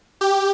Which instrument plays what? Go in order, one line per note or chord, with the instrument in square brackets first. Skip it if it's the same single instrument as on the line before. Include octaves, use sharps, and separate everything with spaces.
[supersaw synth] G4